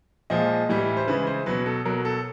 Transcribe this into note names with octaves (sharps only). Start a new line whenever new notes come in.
A#2 F3 G#3 D#5
A2 E3 G3
C5
C#3 E3 G#3 B4
C5
B2 F#3 B4
A4
B2 F#3 A#4
A4